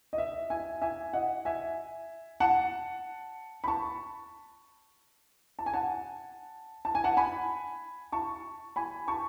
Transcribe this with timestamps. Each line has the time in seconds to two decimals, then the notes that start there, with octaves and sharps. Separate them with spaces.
0.13 D#5
0.18 E5
0.50 E5 G#5
0.81 E5 G#5
1.13 D#5 F#5
1.45 E5 G#5
2.40 F#5 A5
3.64 B5
3.67 A5 C#6
5.59 A5
5.66 G#5
5.74 F#5 A5
6.85 A5
6.95 G#5
7.04 F#5 A5
7.17 G#5 B5
8.12 A5 C#6
8.76 G#5 B5
9.08 A5 C#6